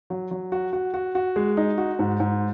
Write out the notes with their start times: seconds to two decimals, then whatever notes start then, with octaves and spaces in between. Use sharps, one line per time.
0.10 F#3
0.31 F#3
0.52 F#4
0.73 F#4
0.94 F#4
1.15 F#4
1.36 G#3
1.57 D#4
1.78 F#4
1.99 G#2
2.20 G#2